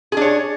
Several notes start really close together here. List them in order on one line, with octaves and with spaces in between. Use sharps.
G#4 D4 C#5